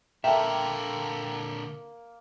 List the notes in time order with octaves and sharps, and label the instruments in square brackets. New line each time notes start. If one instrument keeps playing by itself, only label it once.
[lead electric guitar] A#2 D3 [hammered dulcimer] A#3 [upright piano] A4 G5 [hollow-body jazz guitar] E5